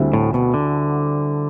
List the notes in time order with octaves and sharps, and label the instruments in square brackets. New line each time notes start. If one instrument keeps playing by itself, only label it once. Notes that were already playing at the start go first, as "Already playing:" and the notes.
Already playing: [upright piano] D2 D3 G3 C4 E4
[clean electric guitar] A2
B2
D3